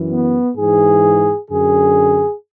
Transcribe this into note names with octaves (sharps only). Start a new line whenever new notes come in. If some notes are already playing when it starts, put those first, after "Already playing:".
Already playing: F#2 E3
B3
G#2 E3 G#4
F#2 D3 G#4